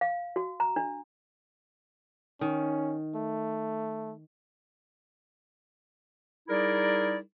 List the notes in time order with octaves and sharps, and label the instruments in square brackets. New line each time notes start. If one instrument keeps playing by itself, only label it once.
[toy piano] F5
F#4
A#5
D4
[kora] D#3 [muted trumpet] C#4
[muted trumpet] A3
[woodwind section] G3 D#4 E4 G#4 A#4 D5